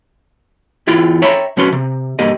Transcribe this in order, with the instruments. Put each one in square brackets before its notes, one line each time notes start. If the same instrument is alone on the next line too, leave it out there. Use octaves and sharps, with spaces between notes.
[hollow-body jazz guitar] E2 E4 F4 G5
C#5 E5 G5 A#5 B5
B2 F#3 C#4 B4 C6
C3
B1 G2 A#3 G4 D#5